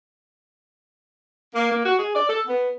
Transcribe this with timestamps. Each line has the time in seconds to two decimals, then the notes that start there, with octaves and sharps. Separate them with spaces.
1.54 A#3
1.70 A#3
1.85 F#4
1.99 G#4
2.14 D5
2.28 A4
2.47 B3